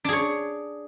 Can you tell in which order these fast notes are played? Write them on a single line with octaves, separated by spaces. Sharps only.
D4 G#4 C#5